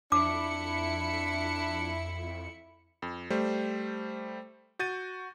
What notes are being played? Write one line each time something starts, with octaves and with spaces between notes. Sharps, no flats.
F2 D4 E4 D6 C#7
F2
G3 A3 C5
F#4 G6 A6 D#7